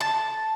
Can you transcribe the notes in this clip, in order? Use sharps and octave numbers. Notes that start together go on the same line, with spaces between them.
A5